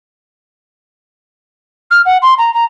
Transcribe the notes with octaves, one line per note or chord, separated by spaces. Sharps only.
F6
F#5
C6
A#5
A#5